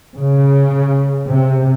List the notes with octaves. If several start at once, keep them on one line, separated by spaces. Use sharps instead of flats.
C#3
C3